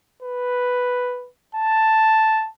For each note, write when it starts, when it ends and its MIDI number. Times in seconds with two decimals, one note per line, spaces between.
0.22 1.28 71
1.55 2.48 81